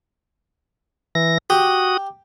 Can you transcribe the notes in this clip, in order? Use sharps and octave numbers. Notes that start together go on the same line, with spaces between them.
E3 A#6
F#4 G4 D#6